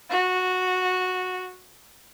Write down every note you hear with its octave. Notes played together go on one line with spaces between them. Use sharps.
F#4